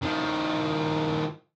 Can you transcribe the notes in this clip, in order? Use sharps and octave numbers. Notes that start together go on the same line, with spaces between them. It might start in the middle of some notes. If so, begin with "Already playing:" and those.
D#3 F3